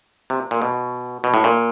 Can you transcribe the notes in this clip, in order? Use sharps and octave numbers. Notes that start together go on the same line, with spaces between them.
C3
A#2
B2
B2
A2
A#2